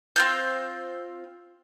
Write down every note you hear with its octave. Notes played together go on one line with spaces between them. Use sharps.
C4 F4 G6